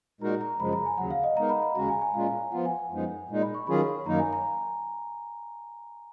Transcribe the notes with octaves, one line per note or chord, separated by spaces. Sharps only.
A#2 G#3 D#4 F#4 A#4 A#5
A#5
F#2 C#3 F3 G#3 B5
A#5
G#5
D#2 C#3 F#3 F#5
F5
D#5
G#3 B3 D#4 A#4 A#5
B5
B5
D#2 C#3 G#3 C#4 F#4 A#5
G#5
G#5
A#2 G#3 C#4 F4 F5
F3 B3 F4 F#5
G#5
G#5
F#2 F3 G#3 B3 D#4
A#2 G#3 D#4
B5
C#6
D#3 F#3 C#4 F4 G#4 B5
F#2 D#3 F#3 A#3 D#4 A#5
G#5
A#5